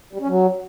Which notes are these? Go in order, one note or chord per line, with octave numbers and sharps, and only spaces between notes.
G3
C#4
F#3